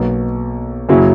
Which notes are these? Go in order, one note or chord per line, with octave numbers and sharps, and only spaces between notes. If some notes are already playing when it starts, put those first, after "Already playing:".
Already playing: B1 B2 A#3
F#2 C#3 F#3 A#3 E4